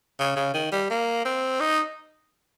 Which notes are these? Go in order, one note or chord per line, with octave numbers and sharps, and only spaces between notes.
C#3
C#3
D#3
G3
A#3
C4
D#4